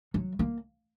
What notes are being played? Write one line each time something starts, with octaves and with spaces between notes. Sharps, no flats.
F#3
A#3